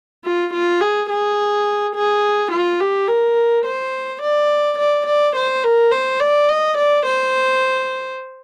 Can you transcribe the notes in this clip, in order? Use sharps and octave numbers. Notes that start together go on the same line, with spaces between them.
F4
F4
G#4
G#4
G#4
F4
G4
A#4
C5
D5
D5
D5
C5
A#4
C5
D5
D#5
D5
C5